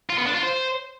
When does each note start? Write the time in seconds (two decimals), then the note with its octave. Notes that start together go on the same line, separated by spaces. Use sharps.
0.10 F4
0.18 B3
0.26 D4
0.35 F4
0.43 C5